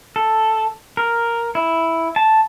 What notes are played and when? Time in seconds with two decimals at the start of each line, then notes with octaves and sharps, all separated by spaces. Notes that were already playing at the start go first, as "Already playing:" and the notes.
0.16 A4
0.97 A#4
1.55 E4
2.16 A5